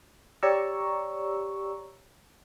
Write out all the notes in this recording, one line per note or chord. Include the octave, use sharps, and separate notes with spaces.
G4 C#5 D5 A#5 C#6 E6